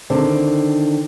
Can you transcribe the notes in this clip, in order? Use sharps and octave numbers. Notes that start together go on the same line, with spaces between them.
D3 D#3 C4